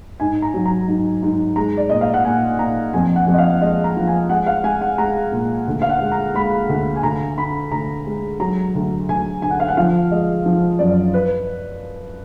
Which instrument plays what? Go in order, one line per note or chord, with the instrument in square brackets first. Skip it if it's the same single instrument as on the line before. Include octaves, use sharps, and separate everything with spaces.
[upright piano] G#2 G#5
A#5
F#3
A#5
G#2
G#2
G#3 A#5
D5
A#2 D#5
F5
F#5
A#2 G#5
A#2 A#5
F2 G#5
F#5
F2
D#5
F5
G#3 D#5
A#5
F3
G#5
G#3 F#5
F5
G#3 G#5
F#5
G#3 A#5
A#2
D2
F5
F#5
G#3
A#5
G#3 B5
D2
G#5
D2 A#5
D3 B5
D2 A#5
G#3
F#3 A#5
D2
D2 G#5
D3 G#5
F#5
F5
F#5
F3 F5
G#3 D#5
F3
F#2 D5
B4